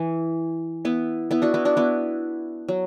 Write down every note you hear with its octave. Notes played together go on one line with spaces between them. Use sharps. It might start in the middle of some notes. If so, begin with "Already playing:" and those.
Already playing: E3
B3 E4
B3 E4
D4 F#4
B3 E4
D4 F#4
B3 E4
F#3